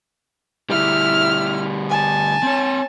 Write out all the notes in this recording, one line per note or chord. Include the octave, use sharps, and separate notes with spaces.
D2 G3 E4 F6
G#5 A5
C4 C#5